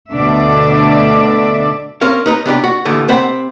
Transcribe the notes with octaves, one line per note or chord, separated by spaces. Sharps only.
D2 B2 D3 D4 D5 E5
C4 C#4 A#4 F5
D#4 B4 A#5
C3 B3 D4 G4
F#4
D#2 A2 D3 E3 A3
C3 C4 C5 F#5 B5